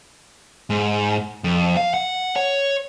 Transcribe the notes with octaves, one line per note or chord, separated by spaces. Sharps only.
G#2
F2
F5
F#5
C#5